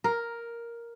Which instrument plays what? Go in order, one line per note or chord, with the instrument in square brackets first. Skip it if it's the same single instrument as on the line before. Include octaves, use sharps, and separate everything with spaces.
[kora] A#4